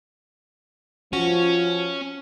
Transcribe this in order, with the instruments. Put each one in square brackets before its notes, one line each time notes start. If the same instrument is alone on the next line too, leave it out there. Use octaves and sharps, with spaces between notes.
[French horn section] F3 [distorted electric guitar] C#4 [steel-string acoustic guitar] F#4